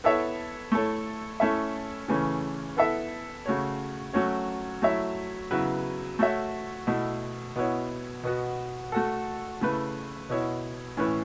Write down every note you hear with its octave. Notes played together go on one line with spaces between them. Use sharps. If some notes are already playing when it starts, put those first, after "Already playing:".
B3 E4 A4 C#5 E5
A3 E4 A4 C#5
A3 C#4 E4 A4 E5
C#3 E3 A3 C#4
B3 E4 A4 E5
C#3 A3 F#4 C#5
F#3 A3 C#4 F#4 C#5
F#3 A3 E4 C#5 E5
C#3 F#3 B3 E4 B4
A3 F#4 C#5 E5
B2 A3 E4
B2 B3 E4 C#5
B2 B3 F#4
A3 F#4 A4
C#3 A3 E4 B4
B2 B3 E4 C#5
A2 E3 C#4 E4 B4